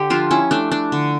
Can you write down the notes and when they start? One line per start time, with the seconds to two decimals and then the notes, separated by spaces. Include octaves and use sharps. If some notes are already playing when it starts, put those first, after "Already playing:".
Already playing: D3 G4
0.10 F3 D4 F4
0.31 C#4 E4
0.51 A3 D4
0.72 D4
0.92 D3